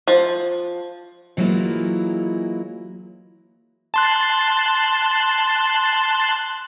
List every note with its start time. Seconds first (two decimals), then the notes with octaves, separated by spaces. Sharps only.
0.08 F3
1.37 E3 F#3 G#3 A#3 E4 F4
3.94 A5 C6 F#6